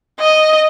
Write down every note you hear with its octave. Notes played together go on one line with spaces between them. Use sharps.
D#5